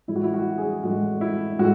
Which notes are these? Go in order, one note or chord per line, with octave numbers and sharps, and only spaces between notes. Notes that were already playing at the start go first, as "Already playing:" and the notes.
A2 E3 G#3 E4
F#4
E4
F#4
G#4
A2 E3 G#3 F#4
E4
A2 G#3 F#4